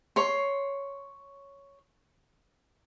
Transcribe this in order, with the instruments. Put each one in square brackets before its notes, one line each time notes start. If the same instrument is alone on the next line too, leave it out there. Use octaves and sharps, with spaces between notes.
[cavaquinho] C#5 C6